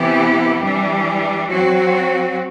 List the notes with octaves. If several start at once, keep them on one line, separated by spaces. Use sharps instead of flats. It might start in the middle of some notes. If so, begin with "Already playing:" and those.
Already playing: C3 E3 B3 E4 G4
E3 G3 D4
F#3 C4 F#4